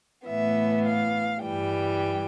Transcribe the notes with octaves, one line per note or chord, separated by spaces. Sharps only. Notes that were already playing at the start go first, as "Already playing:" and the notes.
A2 E3 B3 E5
F5
G2 E3 G3 G5